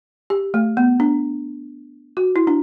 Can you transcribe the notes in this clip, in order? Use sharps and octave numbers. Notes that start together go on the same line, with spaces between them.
G4
A3
B3
D4
F#4
E4
D4